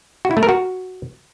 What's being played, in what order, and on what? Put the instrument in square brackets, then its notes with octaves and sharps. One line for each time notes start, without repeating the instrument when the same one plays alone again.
[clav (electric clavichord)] F#4
E4
A3
A#4
F#4